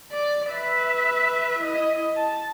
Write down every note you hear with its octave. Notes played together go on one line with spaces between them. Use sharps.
D5
B4 E5
E4 D#5
A5